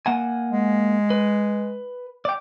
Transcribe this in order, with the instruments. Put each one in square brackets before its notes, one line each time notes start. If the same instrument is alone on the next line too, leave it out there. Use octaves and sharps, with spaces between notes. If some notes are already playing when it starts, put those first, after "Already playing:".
[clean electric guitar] A#3 F#5 G#5
[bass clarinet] G#3
[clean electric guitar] B4
D5 G5